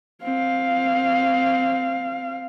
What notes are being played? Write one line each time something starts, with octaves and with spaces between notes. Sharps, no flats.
C4 F5